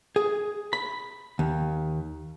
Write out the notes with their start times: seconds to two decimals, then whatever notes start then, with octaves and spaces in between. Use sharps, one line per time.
0.16 G#4
0.73 B5
1.39 D#2